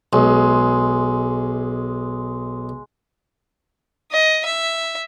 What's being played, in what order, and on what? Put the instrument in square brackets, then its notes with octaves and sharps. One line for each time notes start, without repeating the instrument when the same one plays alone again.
[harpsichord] B1 [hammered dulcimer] G#3
[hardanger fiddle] D#5
E5